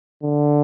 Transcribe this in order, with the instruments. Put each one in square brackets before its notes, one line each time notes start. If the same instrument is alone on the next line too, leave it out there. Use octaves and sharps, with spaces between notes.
[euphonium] D3